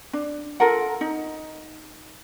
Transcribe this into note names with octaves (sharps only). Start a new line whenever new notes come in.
D4
F4 A4 A#4 F#5
D#4